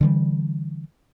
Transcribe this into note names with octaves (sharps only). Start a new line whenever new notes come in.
D3 E3 G3